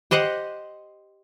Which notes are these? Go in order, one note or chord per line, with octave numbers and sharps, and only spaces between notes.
G4 C5 D#5 F#5